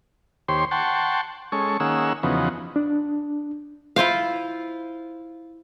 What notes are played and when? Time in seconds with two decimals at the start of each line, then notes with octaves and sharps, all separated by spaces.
0.48 D#2 G4 C5 C#5 C6
0.71 F#5 G5 A5 C6 C#6
1.52 G#3 C#4 A4 C#6
1.80 D#3 A#3 C#4 G#4 F#5 E6
2.23 E2 C#3 F3 B3 D#4 F#4
2.76 D4
3.96 E4 F4 C5 F5